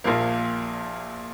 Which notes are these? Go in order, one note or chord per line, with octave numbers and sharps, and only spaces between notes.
A#1 A#2 F3 A#3 F5